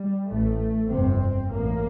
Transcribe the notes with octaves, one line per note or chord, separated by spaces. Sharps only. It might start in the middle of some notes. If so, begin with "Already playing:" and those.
Already playing: G3
A1 A2 A3
G1 F2 C3 C4
A1 A2 A#3